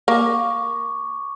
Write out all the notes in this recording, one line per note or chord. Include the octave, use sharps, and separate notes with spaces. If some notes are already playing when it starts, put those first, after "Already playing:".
A#3 C#6 D6